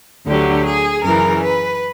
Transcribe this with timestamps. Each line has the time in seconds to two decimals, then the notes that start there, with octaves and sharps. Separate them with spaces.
0.25 D2 D3 F#3 G4
0.65 G#4
1.03 F#2 C#3 E3 A#4
1.42 B4